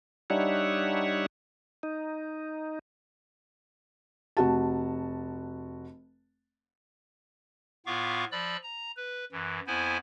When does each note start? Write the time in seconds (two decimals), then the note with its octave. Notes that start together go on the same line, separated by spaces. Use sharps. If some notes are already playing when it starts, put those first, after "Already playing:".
0.30 G3 D4 D#4 C#5 E5 F#5
1.83 D#4
4.37 F1 F#4 A5
7.86 A2 B3 F4 F5 C#6 D6
8.32 F3 D5 B5 E6 F#6
8.63 A#5
8.97 B4
9.32 F#2 E3
9.67 F2 B3 E4 C5 G#5